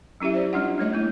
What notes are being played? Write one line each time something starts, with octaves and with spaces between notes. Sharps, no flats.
F#3 C#4 E4 G4 E5
C5 D5
G3 C#4 D4 F4 F#5
G3 A3 C#5 D#5
A3 A#3 E4